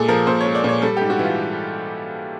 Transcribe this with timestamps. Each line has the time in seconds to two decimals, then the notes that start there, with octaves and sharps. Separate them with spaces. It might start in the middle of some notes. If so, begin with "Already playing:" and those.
Already playing: A#2 G#3 G#4 A4
0.08 F3 A#4
0.27 A#2 C5
0.41 G#3 C#5
0.55 D5
0.64 A#2 C#5
0.82 G3 A4
0.97 G#2 G4
1.10 F#4
1.19 E3
1.24 F4